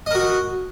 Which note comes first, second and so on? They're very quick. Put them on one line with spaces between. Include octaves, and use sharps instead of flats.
D#5 A#4 F#4